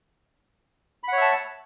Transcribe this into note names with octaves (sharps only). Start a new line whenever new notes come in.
C#5 E5 F#5 A5 B5